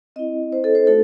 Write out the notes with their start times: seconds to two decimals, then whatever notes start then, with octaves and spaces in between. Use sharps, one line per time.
0.16 C4 E4 D#5
0.53 C5
0.64 A4
0.75 C5
0.87 A3 D#4 F#4 A4